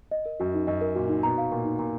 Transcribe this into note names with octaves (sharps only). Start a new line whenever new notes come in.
D#5
A#4
F#2 F#4
D#4
F#2 D#5
A#4
A#2 F#4
D#4
B2 A#5
F5
A#2 A#4
D#4
A#2 A#5